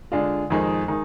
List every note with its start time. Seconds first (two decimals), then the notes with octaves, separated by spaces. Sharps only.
0.12 D3 G#3 D4 F4
0.50 F2 D#3 G#3 D#4
0.88 D#3 G#3 D#4